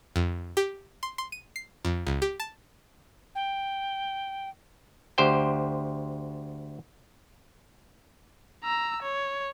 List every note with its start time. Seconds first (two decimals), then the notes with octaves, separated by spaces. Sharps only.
0.16 F2
0.57 G4
1.03 C6
1.18 C6
1.32 D#7
1.56 C7
1.85 F2
2.07 C#2
2.22 G4
2.40 A5
3.35 G5
5.18 D2 G4 C5 G5
8.64 A#5 E6
9.02 C#5